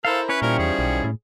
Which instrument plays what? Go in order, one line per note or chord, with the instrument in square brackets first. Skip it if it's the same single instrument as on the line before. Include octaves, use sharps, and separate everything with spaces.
[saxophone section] E4 A#4 C5 [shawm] A4 [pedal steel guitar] F5
[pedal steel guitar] C#4 E4 C#5 [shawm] B4
[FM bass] A#2 [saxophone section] D#3 F3 G3 [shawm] A#4
[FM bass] E2 [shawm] G#4
[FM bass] B1
A2